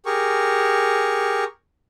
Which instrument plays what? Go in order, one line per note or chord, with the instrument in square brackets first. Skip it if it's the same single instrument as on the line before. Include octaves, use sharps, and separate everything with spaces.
[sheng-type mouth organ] G4 G#4 A#4 C#6